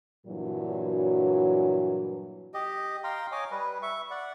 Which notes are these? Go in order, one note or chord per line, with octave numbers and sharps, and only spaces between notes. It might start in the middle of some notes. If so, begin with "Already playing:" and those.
G2 A#2 E3 F#3
G4 D#5
F5 G5 A#5 C6
C#5 D#5 G#5 D6
G3 B4
E5 C#6
D5 F#5